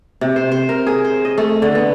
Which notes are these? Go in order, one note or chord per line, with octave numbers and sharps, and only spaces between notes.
C3
C5
C5
A#4
G#4
C5
D#5
A3
D3
B3